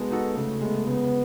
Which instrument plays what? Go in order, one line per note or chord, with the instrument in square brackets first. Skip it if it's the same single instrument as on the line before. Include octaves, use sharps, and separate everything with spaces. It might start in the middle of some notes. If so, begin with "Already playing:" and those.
Already playing: [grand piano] G#3 D#4 F#4 A4 [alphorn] B3
[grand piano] D#4 F#4 A4
[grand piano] C#3 [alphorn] A3
[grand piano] G#3 B3
[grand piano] C#3 [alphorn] B3